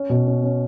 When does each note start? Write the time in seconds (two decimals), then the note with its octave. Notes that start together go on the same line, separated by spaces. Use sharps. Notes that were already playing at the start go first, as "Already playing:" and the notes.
Already playing: C#4
0.10 B2
0.27 C#4
0.43 C#4